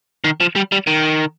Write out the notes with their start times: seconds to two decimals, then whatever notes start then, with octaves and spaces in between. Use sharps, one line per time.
0.24 D#3
0.40 F3
0.56 G3
0.72 G3
0.87 D#3